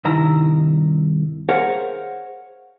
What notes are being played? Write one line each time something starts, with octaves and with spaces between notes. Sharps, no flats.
C2 G2 D#3 E4 A#5
G#4 A#4 C5 C#5 F5 F#5